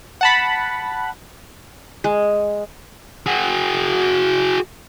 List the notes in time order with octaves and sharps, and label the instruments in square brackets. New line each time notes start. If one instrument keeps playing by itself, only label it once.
[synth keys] F#5 A5 B5
[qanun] G#3
[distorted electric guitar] F#4 G#4